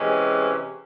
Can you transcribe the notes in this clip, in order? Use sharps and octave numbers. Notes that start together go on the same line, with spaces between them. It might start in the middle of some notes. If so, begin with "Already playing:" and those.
Already playing: C3 E3 G#3 C#4